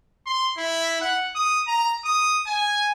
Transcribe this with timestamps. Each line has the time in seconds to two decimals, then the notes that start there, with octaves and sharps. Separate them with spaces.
0.26 C6
0.57 E4
1.01 F#5
1.35 D#6
1.67 A#5
2.05 D#6
2.47 G#5